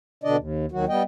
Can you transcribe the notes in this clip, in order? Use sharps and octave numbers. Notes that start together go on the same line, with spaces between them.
B2 D3 D4 D5 D#5
D#2
D#2 D#3 F#3 F#4
G3 B3 D#5 G5